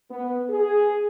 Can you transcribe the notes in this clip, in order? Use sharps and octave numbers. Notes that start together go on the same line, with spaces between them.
B3
G#4